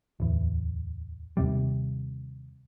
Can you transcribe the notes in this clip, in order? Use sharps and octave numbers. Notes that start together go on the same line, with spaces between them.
D1 E2
D#2 C3 G3